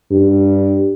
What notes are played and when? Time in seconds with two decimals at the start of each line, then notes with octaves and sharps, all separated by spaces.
0.11 G2